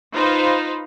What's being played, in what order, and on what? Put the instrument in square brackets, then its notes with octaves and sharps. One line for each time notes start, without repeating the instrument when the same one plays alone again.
[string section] D#4 F4 B4 C5 F5